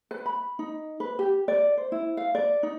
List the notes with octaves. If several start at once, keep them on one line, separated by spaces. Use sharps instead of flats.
B4
B5
D#4
B4
G4
D5
C5
E4
F5
D5
D#4